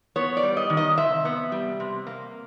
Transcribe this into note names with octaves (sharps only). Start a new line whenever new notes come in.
B3 C#5
D5
G3
D#5
D#3
D#5
C3 E5
B3
G3
C3
A#3